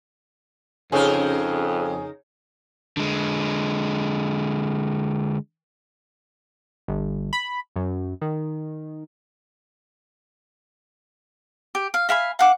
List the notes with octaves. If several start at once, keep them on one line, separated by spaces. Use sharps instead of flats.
F2 C#3 D#4 G#4 A#4 C#5
D3 G#3
G1
B5
F#2
D#3
G4
F5
E5 F5 G#5 B5
F5 F#5 D6